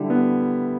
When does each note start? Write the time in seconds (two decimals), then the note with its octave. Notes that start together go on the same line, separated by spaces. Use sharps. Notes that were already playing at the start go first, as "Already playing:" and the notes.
Already playing: D3 G3 E4
0.10 B3